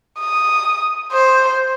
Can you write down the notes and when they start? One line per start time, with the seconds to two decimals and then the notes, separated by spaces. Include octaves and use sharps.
0.20 D#6
1.12 C5